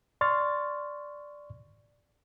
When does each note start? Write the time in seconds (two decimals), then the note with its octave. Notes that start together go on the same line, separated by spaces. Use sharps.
0.21 D5 C6 C#6 F6 A6